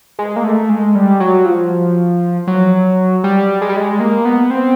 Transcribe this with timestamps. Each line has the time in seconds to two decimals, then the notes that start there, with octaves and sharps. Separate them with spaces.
0.19 G#3
0.36 A#3
0.44 A3
0.69 G#3
0.95 G3
1.20 F#3
1.46 F3
2.47 F#3
3.24 G3
3.62 G#3
3.69 G3
3.76 G#3
4.00 A#3
4.25 B3
4.51 C4